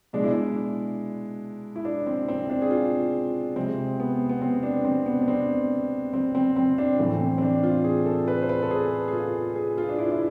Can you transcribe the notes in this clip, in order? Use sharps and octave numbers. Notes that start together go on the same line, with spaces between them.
B2 G#3 D4
E4
D4
E4
D4
C4
C4
D4
G#4
F4
C3 G#3 C4
B3
B3
C4
D4
C4
B3
D4
C4
C4
C4
C4
D4
A2 E3 A3 C4
C4
C4
D4
F4
G#4
A4
B4
C5
B4
A4
G#4
G#4
F4
G#4
F4
D4
E4
E4